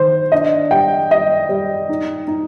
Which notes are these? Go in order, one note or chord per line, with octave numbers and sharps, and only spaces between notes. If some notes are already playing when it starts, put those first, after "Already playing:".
Already playing: D#3 D#4 C5
D4 D#5
G3 G5
G3 D#5
G3
D#4
D#4